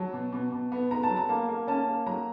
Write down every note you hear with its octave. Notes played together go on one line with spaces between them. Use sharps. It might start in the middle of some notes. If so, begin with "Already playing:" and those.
Already playing: F#3 A5
B2
B2
B2
B3
B3 A#5
A5
F#3
A#5
A#3 A5
A#3
C#4 A5
A#3
F#3 A#5